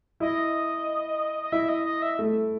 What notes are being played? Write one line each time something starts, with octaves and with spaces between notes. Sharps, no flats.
E4 D#5
D#5
E4 E5
D#5
D#5
E5
A3